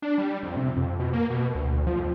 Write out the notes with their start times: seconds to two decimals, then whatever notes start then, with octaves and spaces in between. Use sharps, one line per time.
0.02 D4
0.18 G3
0.43 F2
0.57 C3
0.77 F2
0.99 B2
1.13 A#3
1.30 B2
1.55 D2
1.87 F3
2.00 F2